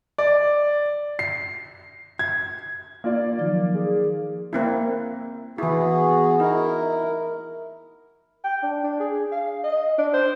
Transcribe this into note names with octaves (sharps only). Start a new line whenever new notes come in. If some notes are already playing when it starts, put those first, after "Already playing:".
D5
C7
G#6
A#3 F4 D5
D#3 F3 F#3
G#4
A#3 C4 E4
E3 B3 E4 F#4 G#4
D#4 E4 A#4
G5
D4
D4
G#4
F5
D#5
D4
C5